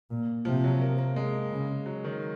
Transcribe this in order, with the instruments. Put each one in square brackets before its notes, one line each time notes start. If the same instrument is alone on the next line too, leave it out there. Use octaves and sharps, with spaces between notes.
[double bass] A#2
[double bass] C3 [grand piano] F3
[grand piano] F#3
A#3
A#3
G#3
[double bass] C#3
[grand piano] F#3
D#3